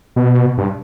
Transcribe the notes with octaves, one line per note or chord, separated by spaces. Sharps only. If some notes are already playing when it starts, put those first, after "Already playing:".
B2
G2